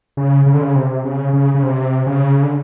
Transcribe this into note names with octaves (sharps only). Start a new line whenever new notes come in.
C#3
C#3
D3
C#3
C3
C#3
C#3
C#3
C3
C#3
D3